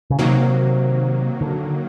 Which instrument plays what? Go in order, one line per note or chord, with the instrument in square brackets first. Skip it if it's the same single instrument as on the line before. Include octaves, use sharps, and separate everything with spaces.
[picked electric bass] C#3
[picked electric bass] C3 [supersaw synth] D#3 F#3 A#3
[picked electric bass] D3